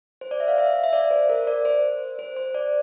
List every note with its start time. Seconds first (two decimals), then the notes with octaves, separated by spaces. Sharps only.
0.21 C5
0.31 D5
0.40 E5
0.48 F5
0.58 E5
0.84 E5
0.93 D5
1.11 C5
1.29 A#4
1.47 D5
1.65 C5
2.19 C5
2.36 C5
2.55 D5